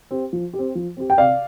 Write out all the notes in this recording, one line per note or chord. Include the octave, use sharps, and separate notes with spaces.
C4 G4
F3
G4
C4
F3
C4 G4
G5
C3 D5 F5